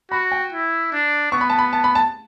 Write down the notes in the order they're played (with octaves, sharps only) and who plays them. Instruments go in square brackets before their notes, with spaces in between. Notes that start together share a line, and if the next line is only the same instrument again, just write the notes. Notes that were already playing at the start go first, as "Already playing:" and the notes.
[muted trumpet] F#4 [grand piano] B5
[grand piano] G5
[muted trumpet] E4
D4
[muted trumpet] B3 [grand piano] C#6
[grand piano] B5
A5
B5
A5
B5
A5